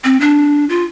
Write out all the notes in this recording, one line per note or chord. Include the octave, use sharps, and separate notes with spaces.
C4
D4
F4